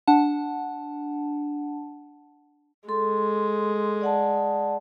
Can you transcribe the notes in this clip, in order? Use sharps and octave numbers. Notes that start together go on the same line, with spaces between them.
D4 F#5 A5
G#3 A4 C6
D5 F#5 A5